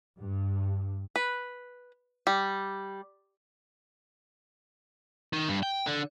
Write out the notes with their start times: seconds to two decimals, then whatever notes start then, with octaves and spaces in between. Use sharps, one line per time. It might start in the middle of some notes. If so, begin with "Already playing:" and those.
0.18 G2
1.16 B4
2.27 G3
5.33 D#3
5.49 G2
5.63 G5
5.87 D3